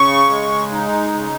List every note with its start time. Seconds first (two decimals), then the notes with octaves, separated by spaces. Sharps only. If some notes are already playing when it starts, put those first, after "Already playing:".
Already playing: C#3 C#6
0.29 G#3
0.72 D#4
1.14 C#3